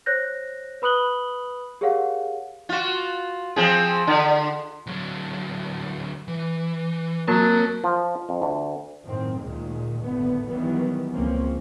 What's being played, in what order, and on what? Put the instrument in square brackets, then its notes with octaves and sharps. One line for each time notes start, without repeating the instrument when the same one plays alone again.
[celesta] C5 C#5 F#6 G6 A#6
B4 B5 D#6 F#6 F#7 G7
G4 G#4 A#4 C#5 F5 F#5
[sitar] F4 F#4
F3 C4 G#4
D3
[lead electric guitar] D2 F#3
E3
[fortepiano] F#3 [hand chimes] A#3 A#4 A6 [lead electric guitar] C4 A5
[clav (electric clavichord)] F3
F2
D2
[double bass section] F#2 A2 D#3 C4
D2 A#2 D#3 G#3
G#1 D#2 A2 D3 A3 B3
D#3 E3 F#3 G3 B3
C#2 F3 A#3 C4 C#4